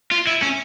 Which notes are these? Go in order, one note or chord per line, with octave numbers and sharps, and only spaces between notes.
F4
E4
C#4